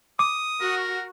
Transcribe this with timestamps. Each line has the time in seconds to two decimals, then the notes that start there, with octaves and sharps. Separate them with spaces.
0.19 D6 D#6
0.61 F#4 A#4